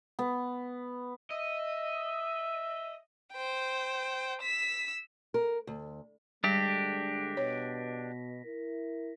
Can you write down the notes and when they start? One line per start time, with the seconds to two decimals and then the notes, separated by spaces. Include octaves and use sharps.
0.19 B3
1.31 D#5 E5
3.32 C5 G5
4.41 E6 B6
5.34 A#4
5.67 D2
6.44 D2 D3 G3 G#3 D4 G4 A#6 B6
7.37 B2 C#5
8.45 E4 A#4